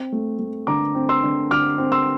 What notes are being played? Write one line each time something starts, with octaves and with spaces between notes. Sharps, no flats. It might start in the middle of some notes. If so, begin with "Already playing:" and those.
Already playing: C4
A3
A3
D3 A#5 D6
C4
C6 E6
D3
D3 D6 F6
C4
C6 E6